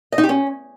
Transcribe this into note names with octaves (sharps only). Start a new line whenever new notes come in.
D#5
D#4
G4
C#4